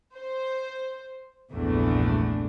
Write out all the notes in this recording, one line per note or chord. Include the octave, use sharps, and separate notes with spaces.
C5
A#1 E2 G2 A3 D4